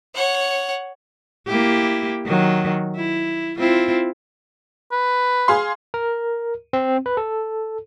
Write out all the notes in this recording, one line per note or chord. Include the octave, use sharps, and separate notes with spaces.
C#5 F#5
A#3 E4 G4
D#3 F#3
E4
C4 E4 F4
B4
G#4 F5 C6
A#4
C4
B4
A4